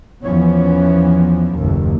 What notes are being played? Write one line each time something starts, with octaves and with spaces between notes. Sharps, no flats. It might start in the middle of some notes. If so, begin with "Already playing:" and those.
E2 E3 F3 B3 C#4
F#1 D#2 A2